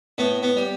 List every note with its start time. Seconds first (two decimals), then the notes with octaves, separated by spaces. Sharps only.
0.18 A2 B3
0.43 B3
0.57 G3